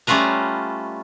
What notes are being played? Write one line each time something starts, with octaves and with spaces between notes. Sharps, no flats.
G3 A3 C#4 F4 B4 A#5